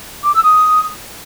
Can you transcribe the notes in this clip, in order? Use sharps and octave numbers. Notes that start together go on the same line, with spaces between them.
D6
E6
D#6